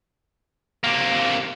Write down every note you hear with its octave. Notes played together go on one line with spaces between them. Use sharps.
C3 A#3